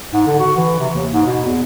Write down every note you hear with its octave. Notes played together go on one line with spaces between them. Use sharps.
G#2
D3
F#4
E3
C3
D#2
G#2
B2
E2